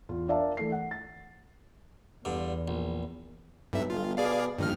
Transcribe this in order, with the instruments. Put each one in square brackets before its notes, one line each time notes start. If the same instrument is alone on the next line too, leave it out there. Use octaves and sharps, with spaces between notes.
[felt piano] E2 F4
D4 A#4 D5 E5 F5 A5
E3 A3 C7
F#5
A6
[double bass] E2 [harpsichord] G2 D3
[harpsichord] A#1
[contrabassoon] B1 [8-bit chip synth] G2 E5
[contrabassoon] G1 [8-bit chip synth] F4
[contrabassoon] B2 [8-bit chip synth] G#4 D5 F5
[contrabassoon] A#1 [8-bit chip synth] G2 D#3 F6